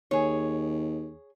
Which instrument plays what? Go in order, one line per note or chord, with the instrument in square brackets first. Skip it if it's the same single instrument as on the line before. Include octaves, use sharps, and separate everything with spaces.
[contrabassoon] D#2 [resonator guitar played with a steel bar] G#4 C#5